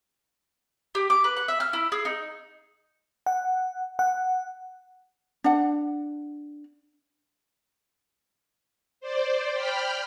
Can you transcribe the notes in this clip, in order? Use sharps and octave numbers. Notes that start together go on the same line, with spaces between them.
G4
D6
B4
F#5
E5
F6
E4
G#4
D#4
F#5
F#5
D4 F#5
C5 D5
G5 B5 F6